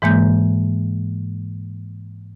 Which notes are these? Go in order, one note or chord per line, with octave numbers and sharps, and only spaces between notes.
G#2 E3 G#3 A#3 G6